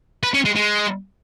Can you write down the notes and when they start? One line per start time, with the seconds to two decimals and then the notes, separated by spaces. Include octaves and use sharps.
0.24 B4
0.34 C#4
0.45 G#3
0.56 G#3